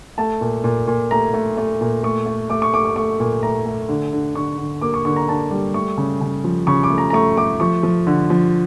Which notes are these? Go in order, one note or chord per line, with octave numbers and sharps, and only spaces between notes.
A3 A5
A#2
A#2
A#2
A3 A#5
A3
A3
A#2
A3 C#6
A3
A3 D6
C#6
A3 D6
D6
A3 C#6
A#2
A3 A#5
A3
D3
D3
D3 C#6
D3
A#3 D6
C#6
D3 C#6
A#5
D3 A5
G3
A3 C#6
C#3
C#3
F3
C#3 C#6
D6
A3
A#5
A#5
A3 C#6
A3 D6
F3 C#6
F3
D3
F3